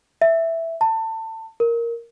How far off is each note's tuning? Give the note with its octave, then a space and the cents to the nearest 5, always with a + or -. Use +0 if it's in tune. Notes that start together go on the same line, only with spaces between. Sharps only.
E5 +0
A5 +25
A#4 +0